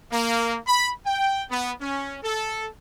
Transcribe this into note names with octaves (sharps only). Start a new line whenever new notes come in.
A#3
B5
G5
B3
C#4
A4